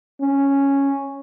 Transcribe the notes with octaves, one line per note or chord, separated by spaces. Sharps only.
C#4